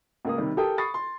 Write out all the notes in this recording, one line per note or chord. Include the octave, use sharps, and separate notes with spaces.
C#2 A#3 D#6
C3 D#3 G3
G4 A4 A#4 G5 D#6
B5 C#6 D#6 A6 C7
C6